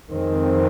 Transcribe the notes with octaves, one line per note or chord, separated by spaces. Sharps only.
F2 D#3 G#3 C4